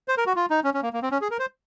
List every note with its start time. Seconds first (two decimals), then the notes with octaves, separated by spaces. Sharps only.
0.08 C5
0.18 A#4
0.26 F#4
0.36 F4
0.50 D#4
0.64 C#4
0.74 C#4
0.83 A#3
0.93 A#3
1.02 C4
1.11 C#4
1.21 G#4
1.31 A#4
1.39 C5